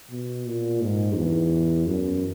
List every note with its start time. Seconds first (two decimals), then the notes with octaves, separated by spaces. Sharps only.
0.11 B2
0.46 A#2
0.81 G#2
1.17 E2
1.87 F#2